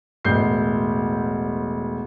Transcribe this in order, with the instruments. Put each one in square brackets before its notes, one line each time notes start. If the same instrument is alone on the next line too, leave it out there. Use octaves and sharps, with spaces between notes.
[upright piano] E1 A1 G6 C7